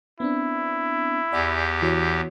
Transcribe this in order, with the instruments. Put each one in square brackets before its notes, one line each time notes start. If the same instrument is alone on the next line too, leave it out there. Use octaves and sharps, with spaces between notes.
[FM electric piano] B3 C4 D4 [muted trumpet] E4
[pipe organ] E2 G4 [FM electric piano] D5 F#5 G#5
[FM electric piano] E3 F#4 C#5